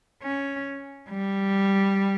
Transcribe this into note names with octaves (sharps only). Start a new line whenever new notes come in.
C#4
G3